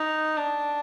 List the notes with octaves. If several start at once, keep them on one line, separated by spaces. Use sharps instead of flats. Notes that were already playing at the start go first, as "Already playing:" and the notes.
Already playing: D#4
D4